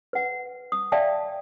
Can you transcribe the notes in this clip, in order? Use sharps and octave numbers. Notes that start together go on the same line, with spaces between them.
B4 F#5
D#6
D5 E5 F5 G5 A5